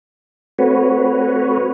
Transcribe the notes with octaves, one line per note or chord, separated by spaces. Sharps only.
A3 C4 F#4 B4 C#5